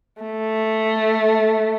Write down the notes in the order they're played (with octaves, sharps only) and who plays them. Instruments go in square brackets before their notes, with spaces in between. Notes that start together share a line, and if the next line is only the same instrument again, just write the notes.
[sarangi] A3